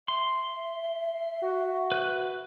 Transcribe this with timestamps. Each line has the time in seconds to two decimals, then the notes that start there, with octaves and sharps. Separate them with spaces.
0.08 E5 C6
1.42 F#4
1.92 B4 F#6